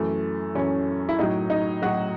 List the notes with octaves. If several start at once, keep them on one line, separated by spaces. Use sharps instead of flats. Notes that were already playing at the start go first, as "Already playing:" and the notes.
Already playing: F#2 E3 A3
F#2 E3 C#4
E4
A2 F#3 D#4
D#4
A2 F#3 F#4